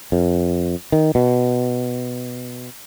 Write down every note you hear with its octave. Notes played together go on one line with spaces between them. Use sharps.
F2
D#3
B2